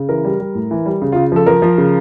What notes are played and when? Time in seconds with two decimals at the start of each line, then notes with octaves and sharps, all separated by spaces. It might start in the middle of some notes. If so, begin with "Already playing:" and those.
Already playing: C#3
0.09 E3 A#4
0.24 G3
0.40 G3
0.55 A2
0.71 E3
0.86 G3
1.02 C#3
1.12 C#3 F4
1.32 F3 A4
1.46 F3 A#4
1.62 F3
1.78 C#3